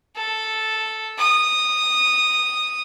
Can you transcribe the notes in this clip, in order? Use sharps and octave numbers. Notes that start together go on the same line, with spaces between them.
A4
D#6